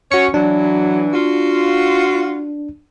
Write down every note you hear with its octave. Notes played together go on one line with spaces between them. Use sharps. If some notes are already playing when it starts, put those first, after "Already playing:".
C#4 F#4 C#5 C#7
E3 F#3 D4
F4 F#4